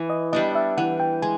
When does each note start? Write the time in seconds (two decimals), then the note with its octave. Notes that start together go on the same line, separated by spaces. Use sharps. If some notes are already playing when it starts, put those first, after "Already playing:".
Already playing: E3
0.10 D#5
0.33 G3 B3 D4 D#5
0.55 E5
0.77 E3 F#5
1.00 G5
1.22 G#3 G#5